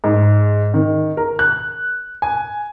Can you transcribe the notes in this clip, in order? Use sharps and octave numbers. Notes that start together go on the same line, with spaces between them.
G#2
D#3
A#4
F#6
G#5